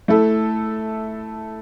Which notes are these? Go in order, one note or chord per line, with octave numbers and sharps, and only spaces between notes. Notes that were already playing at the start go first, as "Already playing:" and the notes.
A3 E4 A4